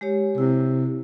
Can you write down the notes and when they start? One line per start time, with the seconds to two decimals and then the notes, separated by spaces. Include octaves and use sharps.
0.01 G#3 G4 C#5
0.38 C3 E4